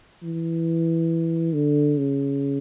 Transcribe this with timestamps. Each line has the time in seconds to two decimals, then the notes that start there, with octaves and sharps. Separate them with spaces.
0.23 E3
1.53 D3
1.98 C#3